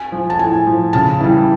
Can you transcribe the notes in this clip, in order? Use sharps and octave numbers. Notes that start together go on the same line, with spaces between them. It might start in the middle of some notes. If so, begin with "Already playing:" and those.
Already playing: G#5
F3
A5
A2 G#5
F3
C#3 A5
E3 G3